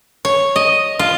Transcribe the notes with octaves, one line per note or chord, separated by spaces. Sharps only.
C#5
D#5
F4